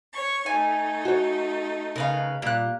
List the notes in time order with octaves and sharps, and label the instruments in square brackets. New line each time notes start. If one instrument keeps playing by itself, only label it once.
[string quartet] C#5 C#6
[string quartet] A3 D#4 [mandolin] G#5
[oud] F#4 C#5
[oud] C#3 [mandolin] A#4 B4 F5
[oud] A#2 G3 [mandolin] A#3 F#6